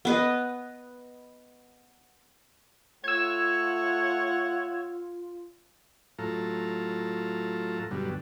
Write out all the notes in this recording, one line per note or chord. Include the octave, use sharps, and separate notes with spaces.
B3 B4 D#5
A3 F4 C#5 F#5 E6 G#6
A2 F#3 F4 A4 A#5
G2 B2 D3 F#3 G3